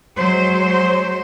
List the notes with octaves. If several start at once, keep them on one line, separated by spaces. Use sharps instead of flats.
F#3 G#3 C5